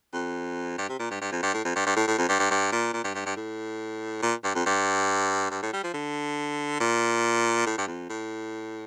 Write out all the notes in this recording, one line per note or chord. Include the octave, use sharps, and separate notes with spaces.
F2
G2
C3
A#2
G2
G2
F2
G2
A2
F2
G2
G2
A2
A2
F2
G2
G2
G2
A#2
A#2
G2
G2
G2
A2
A#2
G2
F2
G2
G2
A2
G3
F3
D3
A#2
A2
G2
F2
A2